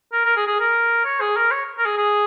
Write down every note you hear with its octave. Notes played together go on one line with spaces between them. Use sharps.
A#4
A#4
G#4
G#4
A#4
C#5
G#4
A#4
C#5
A#4
G#4
G#4